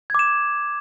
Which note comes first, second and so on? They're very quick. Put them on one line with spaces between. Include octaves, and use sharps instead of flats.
G#6 D6 E7